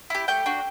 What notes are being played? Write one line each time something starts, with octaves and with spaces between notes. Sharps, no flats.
E4 G4
A3 G4 G5
D4 F#4